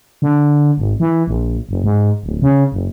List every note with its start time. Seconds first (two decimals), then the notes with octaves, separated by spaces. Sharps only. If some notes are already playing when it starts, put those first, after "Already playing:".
0.22 D3
0.78 G#1
1.00 E3
1.27 A#1
1.69 F#1
1.84 G#2
2.23 D1
2.42 C#3
2.72 F#1